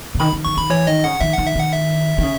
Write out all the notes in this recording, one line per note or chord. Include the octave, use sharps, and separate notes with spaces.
C#3
D#3 B5
D#3
D#3 C#6
D#3 B5
E3 C#5
D#3 D#5
C#3 F#5
D#3 E5
D#3 F#5
E5
D#3 F#5
E5
D#3
C#3